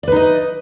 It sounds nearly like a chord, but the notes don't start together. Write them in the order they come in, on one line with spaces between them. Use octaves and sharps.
D5 B4 D#4 D#5